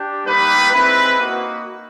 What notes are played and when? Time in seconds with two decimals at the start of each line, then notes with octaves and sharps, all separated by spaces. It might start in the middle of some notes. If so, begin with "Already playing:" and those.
Already playing: D4 G4
0.25 G3 A#3 D#4 B4
0.72 G#3 C4 E4 B4
1.20 A#3 D#4 F#4